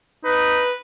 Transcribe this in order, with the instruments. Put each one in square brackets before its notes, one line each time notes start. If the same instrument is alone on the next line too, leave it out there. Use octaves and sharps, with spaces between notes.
[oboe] D#4 [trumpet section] B4